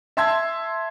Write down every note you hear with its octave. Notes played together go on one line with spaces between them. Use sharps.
E5 A5 C6 E6 G#6